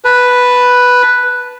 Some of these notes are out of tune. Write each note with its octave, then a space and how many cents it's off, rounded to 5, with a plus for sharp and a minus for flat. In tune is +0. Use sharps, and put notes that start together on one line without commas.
B4 +0 A5 +0